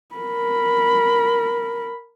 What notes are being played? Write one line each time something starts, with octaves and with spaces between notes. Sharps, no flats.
A#4 B5